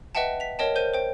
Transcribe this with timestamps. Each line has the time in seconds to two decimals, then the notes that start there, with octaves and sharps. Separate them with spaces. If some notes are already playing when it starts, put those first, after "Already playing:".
0.15 B4 D#5 E5 F#5 G5 A5
0.40 B6 F7
0.59 A#4 C#5 D#5 G5 A5
0.76 A#4 C5 G6 D#7
0.94 C5 G5